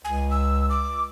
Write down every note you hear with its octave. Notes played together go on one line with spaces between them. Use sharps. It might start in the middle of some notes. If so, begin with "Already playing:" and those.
C#2 G#5
E6
D6